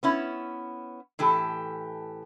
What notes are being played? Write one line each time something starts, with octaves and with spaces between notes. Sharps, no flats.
B3 C#4 E4
A2 E3 G4 A4